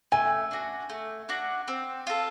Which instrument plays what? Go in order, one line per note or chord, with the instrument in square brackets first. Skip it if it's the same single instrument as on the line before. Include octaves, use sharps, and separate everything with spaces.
[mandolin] A3 [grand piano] G#5
[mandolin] D4 F#4
A3
D4 F#4
C4
F4 A4